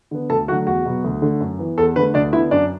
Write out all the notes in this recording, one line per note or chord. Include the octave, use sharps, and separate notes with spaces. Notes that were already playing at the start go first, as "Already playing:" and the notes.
D3 B3
D2 A4 A5
D3 F#3 A3 F#4 F#5
E2 F#4 F#5
B2 F#3 B3
D2
D3 A3
F#2
E3 B3
E2 A4
D3 A3 B4
D2 D4 D5
D3 B3 E4 E5
F#2 D4 D5